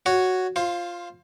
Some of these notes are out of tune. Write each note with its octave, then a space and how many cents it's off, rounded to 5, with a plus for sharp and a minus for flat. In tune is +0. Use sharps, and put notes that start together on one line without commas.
F#4 +0 C#5 +0
F4 +0 C5 +25